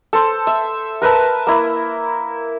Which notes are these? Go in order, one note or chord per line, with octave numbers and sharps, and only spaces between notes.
A4 C5
E5
A#4 B4 E5 A5
A#3 E4